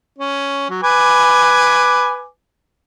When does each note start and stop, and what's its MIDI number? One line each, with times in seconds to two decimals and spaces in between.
0.19 0.69 61
0.70 0.80 54
0.83 2.25 71
0.83 2.25 80
0.83 2.25 86